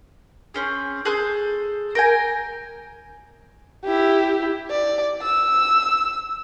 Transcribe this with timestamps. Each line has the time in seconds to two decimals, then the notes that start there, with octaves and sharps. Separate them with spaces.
0.54 C4 C#4 G#4
1.05 G#4 A4 C5 F#6
1.95 A#4 G5 G#5
3.85 E4 G4
4.70 D5
5.23 E6